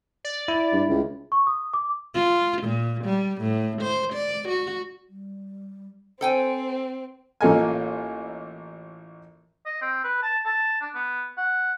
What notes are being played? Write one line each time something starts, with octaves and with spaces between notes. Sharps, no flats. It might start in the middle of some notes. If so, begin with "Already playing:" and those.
D5
E4
G2
C#2
C#6
D#6
D6
F4
A#2
G3
A2
C5
D5
F#4
G3
C4 A4 C5 G5 G#5
A1 A#3 F4 A4 D#5 G#5
D#5
C4
B4
A5
A5
D4
B3
F#5